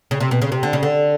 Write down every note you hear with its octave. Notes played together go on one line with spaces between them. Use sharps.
C#3
C3
B2
C#3
C3
D3
C#3
D3